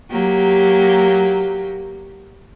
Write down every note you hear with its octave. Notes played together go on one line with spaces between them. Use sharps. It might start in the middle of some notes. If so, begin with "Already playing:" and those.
F#3 A#3 G4